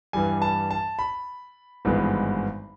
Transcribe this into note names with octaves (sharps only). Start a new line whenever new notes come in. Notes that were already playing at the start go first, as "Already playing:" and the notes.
G2 E3 G3 G#5
A5
A5
B5
G#1 G2 E3 G#3 B3